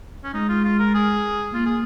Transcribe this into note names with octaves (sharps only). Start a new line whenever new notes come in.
C#4
G#3 D#4
F4
F4
A#4
G#4
A#3 F4
G#4